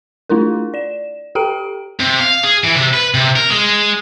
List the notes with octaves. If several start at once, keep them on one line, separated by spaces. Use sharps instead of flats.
A3 D4 E4 F4 A#4
D5 E7
G4 A4 G5 A#5 D7
C3
F5
G#4
E3
C3
B4
C3
A#4
G#3